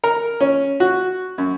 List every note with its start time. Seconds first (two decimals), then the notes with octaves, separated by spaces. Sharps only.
0.04 A#4
0.41 C#4
0.80 F#4
1.38 F#2